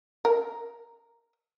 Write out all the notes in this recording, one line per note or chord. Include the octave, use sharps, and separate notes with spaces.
A#4